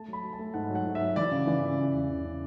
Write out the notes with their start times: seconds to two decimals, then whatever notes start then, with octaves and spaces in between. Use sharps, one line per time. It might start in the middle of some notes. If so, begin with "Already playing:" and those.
Already playing: A3 A5
0.08 F#3 B5
0.24 F#3
0.33 A5
0.39 A3
0.54 G#2 F#5
0.70 F#3
0.75 F#5
0.85 G#2
0.95 E5
1.01 F#3
1.16 E3 D5
1.31 C#3
1.47 E3
1.63 C#3
1.79 C#3
1.94 E2
2.10 C#3
2.25 C#3